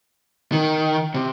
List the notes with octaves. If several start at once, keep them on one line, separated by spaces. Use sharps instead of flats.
D#3
C3